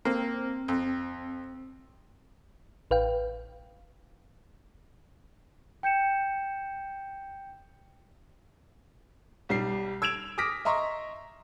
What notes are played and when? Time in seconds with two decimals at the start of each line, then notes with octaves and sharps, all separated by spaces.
0.05 A#3 C4
0.68 F2
2.91 A1 B4 F5 G5
5.83 G5 G6 C#7 E7
9.49 B1 G3 C7
10.02 E6 G#6 D7 E7 F7
10.38 D6 D#6 F6 A#6 B6 D7
10.65 D#5 E5 A#5 C6 C#6